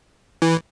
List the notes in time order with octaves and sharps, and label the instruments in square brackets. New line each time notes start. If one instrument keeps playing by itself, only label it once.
[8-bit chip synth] E3